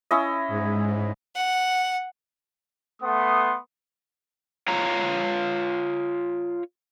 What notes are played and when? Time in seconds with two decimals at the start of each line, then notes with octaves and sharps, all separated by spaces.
0.11 C#4 E4 D#5
0.48 G#2
1.35 F#5
3.02 A3 B3 F#5 C6 D#6
4.68 F4 C#5 F5 A#5